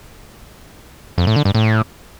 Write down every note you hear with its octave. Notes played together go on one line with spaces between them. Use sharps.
F2
A2
D3
G2
A2